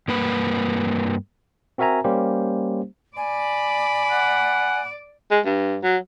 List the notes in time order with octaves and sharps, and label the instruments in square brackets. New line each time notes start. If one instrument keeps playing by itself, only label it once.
[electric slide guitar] G2 A#3 B4
[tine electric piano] C4 F#4 A#4 E5 G#5 A#5
G3 A#3 C#4 G4 C5
[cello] D5 [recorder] G#5 [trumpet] B5
[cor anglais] F#5
[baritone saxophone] G#3
G2
F#3